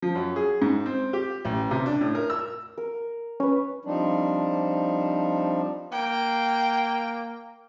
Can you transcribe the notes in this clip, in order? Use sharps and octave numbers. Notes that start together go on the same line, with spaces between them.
F3
F#2
G#4
G#2
C4
G4
A1
C3
D4
A2
A#4
E6
A#4
C#4 B4 C#5
F3 G3 C4 D4 D#4
A#3 G5